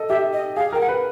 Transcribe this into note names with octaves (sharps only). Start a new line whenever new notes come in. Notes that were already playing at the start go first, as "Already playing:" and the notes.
Already playing: A4 D#5
G4 E5
D#5
G#4 F5
A#4 G5
F#5
B4